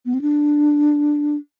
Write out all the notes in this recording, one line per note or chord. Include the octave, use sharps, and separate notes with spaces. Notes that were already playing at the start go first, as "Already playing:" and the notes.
B3
C4
D4